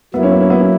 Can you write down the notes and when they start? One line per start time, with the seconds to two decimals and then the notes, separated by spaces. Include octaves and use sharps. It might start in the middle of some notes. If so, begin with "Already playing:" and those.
0.14 F#3 A#3 B3 E4
0.23 C#4
0.32 B3
0.41 C#4
0.50 B3
0.60 C#4